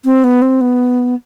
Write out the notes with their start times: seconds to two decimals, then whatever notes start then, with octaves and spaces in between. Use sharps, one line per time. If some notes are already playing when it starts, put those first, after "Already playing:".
0.05 C4
0.24 B3
0.42 C4
0.61 B3